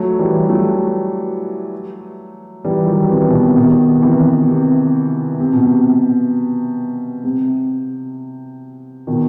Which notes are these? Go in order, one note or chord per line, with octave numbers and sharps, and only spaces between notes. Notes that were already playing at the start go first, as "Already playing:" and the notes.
Already playing: F#3 A3
E3 G3
F#3 A3
E3 G3
D#3 F#3
C3 E3
B2
C3
B2 D#3
C3 E3
C3
C3
B2
C3
C3
B2 D#3